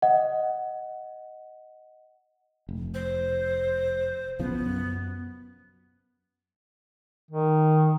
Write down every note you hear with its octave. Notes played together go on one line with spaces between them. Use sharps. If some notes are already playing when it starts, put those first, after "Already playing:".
D#5 F#5
F1
C5
B1 C#3 F3 B3
F#2
D#3